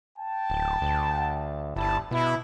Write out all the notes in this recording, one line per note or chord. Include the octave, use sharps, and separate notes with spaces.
G5 A5
D1
D2
G1 G3 E4 A5
B2 E4